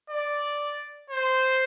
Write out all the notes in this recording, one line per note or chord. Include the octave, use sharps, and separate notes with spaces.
D5
C5